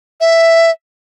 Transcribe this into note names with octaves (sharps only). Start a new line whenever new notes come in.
E5